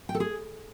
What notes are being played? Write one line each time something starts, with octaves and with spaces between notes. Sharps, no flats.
G5
A4
G#4